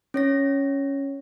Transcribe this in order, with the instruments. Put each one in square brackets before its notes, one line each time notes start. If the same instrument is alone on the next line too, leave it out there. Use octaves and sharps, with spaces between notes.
[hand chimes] C#4 C#5 A#6